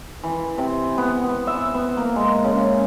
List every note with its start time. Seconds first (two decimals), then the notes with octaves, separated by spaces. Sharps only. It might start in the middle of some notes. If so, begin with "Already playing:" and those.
0.24 E3
0.58 C3
0.98 B3
1.24 B3
1.47 E5
1.74 B3
1.97 A#3
2.16 G#3
2.44 C#3